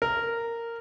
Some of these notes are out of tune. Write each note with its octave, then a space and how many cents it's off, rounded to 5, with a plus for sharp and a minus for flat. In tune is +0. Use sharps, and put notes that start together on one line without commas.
A#4 -10